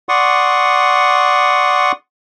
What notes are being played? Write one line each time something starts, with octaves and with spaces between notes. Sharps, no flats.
D5 F#5 C6 C#6 D#6